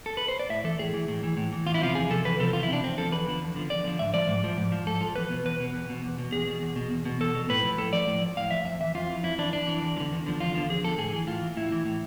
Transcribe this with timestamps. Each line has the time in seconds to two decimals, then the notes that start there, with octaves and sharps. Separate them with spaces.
0.06 A4
0.17 B4
0.28 C5
0.39 D5
0.49 A2 E5
0.64 E3 A4
0.79 A2 G#4
0.94 E3
1.08 A2
1.23 E3
1.37 A2
1.52 E3
1.67 E2 F4
1.74 E4
1.81 C3 F3 F4
1.95 E2 G#4
2.10 C3 F3 A4
2.25 E2 B4
2.40 C3 F3 A4
2.53 E2 F4
2.63 E4
2.69 C3 F3 D4
2.84 E2 C4
2.97 D3 F3 A4
3.12 E2 B4
3.27 D3 F3
3.42 E2
3.56 D3 F3
3.70 E2 D5
3.84 D3 F3
3.99 G#2 E5
4.14 F3 D5
4.28 G#2
4.44 F3
4.57 G#2
4.72 F3
4.86 G#2 A4
5.01 F3
5.16 E2 B4
5.30 B2
5.45 E2 B4
5.60 B2
5.74 E2
5.89 B2
6.04 E2
6.18 B2
6.32 E2 G#4
6.47 B2
6.62 E2
6.76 B2
6.90 E2
7.05 B2
7.20 E2 A4
7.35 B2
7.49 A2 B4
7.64 F3
7.78 A2 A4
7.93 F3 D5
8.07 A2
8.22 F3
8.37 A2 F5
8.51 F3 E5
8.65 F2 E5
8.81 E3 E5
8.95 F2 F4
9.10 E3
9.23 F2 E4
9.38 E3 D4
9.53 F2 D4
9.68 E3
9.82 E2
9.97 F3
10.00 D3
10.12 E2
10.26 D3 F3
10.40 E2 F4
10.55 D3 F3
10.69 E2 G#4
10.85 D3 F3 A4
10.98 A2 G#4
11.13 E3
11.27 A2 F4
11.42 E3
11.57 A2 E4
11.72 E3
11.85 A2